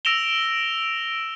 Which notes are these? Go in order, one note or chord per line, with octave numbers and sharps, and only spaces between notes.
E6 A#6 D7 E7 F7 G7